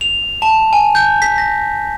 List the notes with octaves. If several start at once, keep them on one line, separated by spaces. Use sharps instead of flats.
F7
A5
G#5
G6
B6
A#6